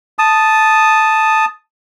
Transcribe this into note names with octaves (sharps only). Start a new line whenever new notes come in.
A5 D#6